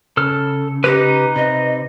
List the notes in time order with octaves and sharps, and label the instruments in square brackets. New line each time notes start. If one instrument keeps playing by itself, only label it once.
[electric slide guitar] C#3 [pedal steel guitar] A4 E6 F6
[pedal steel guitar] D#4 B4 [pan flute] G4
[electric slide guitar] C3 [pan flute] D#5